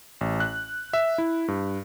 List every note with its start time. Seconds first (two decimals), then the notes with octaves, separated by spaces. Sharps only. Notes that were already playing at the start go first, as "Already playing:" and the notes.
0.21 A1
0.40 F#6
0.93 E5
1.18 E4
1.48 G2